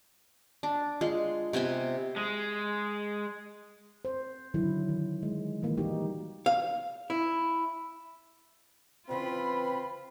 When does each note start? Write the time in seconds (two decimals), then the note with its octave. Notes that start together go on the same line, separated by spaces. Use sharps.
0.63 D4
1.01 G#3 F4
1.53 C3 B3 C5 G#5
2.16 G#3
4.05 C5
4.54 D3 D#3 F#3 E4
4.89 D#3
5.23 G#3
5.62 D#3 E3 A#3
5.77 G3 D#4 F#4 G4
6.46 F5
7.10 E4
9.09 E2 C#3 E3 C4 F4 B5